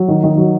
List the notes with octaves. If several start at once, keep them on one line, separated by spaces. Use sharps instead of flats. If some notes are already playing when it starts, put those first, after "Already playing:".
Already playing: F#3
D#3
D#3
F#3